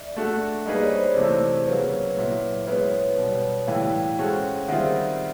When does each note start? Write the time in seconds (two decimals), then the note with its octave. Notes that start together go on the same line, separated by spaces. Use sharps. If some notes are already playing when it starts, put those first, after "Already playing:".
Already playing: D5 E5
0.16 A3 D4 F#4 A4
0.66 G3 A#3 D#4 G#4 B4 D#5
0.75 D5
0.83 C#5
0.91 C5 D5
1.17 C3 E3 A3
1.67 C#3 F#3 A#3 B4 C#5
2.17 A#2 F#3 B3 E4
2.67 G#3 B3 E4 G#4 B4 C#5
3.17 B2 G3 B3
3.67 A2 E3 G3 F5 G5
4.19 G#3 C#4 F#4 A4 C5
4.68 D#3 G3 C4 F4 G#4 E5 F#5